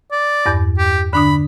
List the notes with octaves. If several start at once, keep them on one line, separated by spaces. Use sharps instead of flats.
D5
E2 G2
G4
D3 D4 B5 D#6